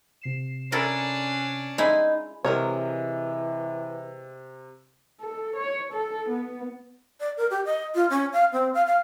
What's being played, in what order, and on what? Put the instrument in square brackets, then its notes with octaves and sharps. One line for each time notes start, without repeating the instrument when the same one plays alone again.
[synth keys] C3 C7 E7
[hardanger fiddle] C#4 D4 [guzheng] E4 A4 A#4
[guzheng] G#3 E4 [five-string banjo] D#4
[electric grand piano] C3 [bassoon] E3 [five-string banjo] G#3 A#4 C#5
[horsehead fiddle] A4
C#5
A4
B3
[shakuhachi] D5
A#4
G4
D#5
F4
C#4
F5
C4
F5
F5